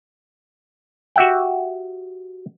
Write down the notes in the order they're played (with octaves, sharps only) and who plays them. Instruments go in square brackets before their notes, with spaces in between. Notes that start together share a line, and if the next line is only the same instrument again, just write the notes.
[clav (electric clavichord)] F#4 G4 E5 F#5 G5